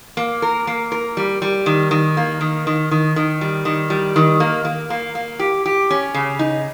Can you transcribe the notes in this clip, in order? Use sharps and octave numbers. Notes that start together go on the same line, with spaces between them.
A#3
A#4
A#3
A#4
G3
G3
D#3
D#3
A#3
D#3
D#3
D#3
D#3
G3
D#3
G3
D#3
A#3
A#3
A#3
A#3
G4
G4
C#4
C#3
D#4